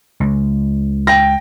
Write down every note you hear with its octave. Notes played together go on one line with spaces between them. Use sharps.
C#2
G5 A#6